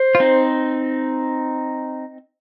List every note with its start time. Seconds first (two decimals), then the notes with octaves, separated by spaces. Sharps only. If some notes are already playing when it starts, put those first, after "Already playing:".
Already playing: C5
0.15 F4
0.20 C4 D#4